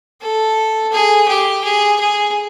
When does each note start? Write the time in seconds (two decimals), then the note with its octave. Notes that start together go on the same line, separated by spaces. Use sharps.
0.21 A4
0.92 G#4
1.28 G4
1.64 G#4
1.99 G#4